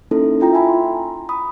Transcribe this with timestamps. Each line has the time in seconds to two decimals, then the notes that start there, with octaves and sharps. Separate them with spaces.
0.11 A#3 C#4 D#4 E4 A4
0.40 E4 F4 G5 A#5
0.53 E5 G5 G#5 A#5 B5
0.69 C6
1.29 B5 D#6